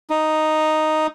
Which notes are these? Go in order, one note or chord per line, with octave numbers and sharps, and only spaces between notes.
D#4